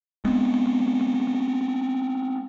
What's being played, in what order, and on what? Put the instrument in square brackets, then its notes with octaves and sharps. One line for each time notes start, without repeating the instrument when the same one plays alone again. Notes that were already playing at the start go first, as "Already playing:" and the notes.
[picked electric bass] G#3 B3 C4